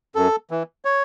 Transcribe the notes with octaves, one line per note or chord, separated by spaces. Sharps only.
F#2 A4
E3
C#5